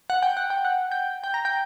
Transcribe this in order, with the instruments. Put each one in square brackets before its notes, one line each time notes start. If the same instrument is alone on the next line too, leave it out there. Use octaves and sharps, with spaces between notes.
[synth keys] F#5
G5
F#5
G5
F#5
G5
G5
A#5
G5